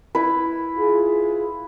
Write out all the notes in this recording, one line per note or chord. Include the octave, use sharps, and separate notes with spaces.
E4 B4
F4 G#4